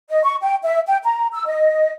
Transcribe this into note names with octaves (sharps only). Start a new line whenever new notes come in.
D#5
C#6
G5
E5
G5
A#5
E6
D#5